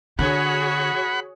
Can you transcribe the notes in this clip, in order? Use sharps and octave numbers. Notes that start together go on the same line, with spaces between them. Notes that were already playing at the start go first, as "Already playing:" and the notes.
D3 F#4 G#4 C#5 F#5 B5